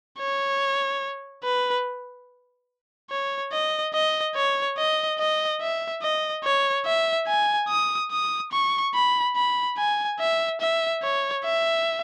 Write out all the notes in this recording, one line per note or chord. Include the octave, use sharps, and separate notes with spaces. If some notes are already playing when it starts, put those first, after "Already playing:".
C#5
B4
C#5
D#5
D#5
C#5
D#5
D#5
E5
D#5
C#5
E5
G#5
D#6
D#6
C#6
B5
B5
G#5
E5
E5
C#5
E5